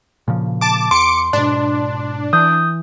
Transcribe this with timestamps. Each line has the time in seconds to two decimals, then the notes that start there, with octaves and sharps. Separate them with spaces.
0.28 A#2 C#3 F3
0.61 A5 D6
0.91 E2 C6 D6 C#7 D7
1.33 G#2 B2 D4
2.33 E3 D#6 G6